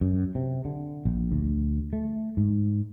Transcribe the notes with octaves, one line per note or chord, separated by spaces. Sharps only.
F#2
C3
D3
A#1
D2
A3
G#2